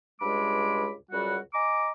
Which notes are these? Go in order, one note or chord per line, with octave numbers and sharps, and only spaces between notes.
C#2 G2 G#3 B5 D6
C#2 F#2 G3 F#4
D#5 G#5 A#5 D6